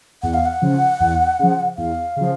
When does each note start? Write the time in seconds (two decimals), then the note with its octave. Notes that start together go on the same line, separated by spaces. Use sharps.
0.23 E2 F#5
0.34 F5
0.46 F#5
0.62 C#3 F3
1.00 E2
1.39 C#3 F3
1.77 E2 F5
2.16 C#3 F3